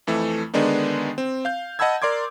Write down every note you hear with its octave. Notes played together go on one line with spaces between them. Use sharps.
F2 E3 A3
D3 D#3 G#3 B3 D4 D#4
C4
F5 G6
D#5 F#5 A5 B5 E6 G#6
A#4 D5 C6 D6 G#6